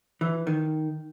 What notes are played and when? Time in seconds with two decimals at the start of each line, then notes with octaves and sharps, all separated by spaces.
0.21 E3
0.47 D#3